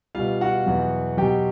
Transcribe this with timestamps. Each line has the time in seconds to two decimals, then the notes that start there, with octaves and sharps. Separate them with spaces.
0.15 B2 G3 F4 F5
0.41 F#4 F#5
0.66 E2 B2 F#3
1.17 B2 F#3 G4 G5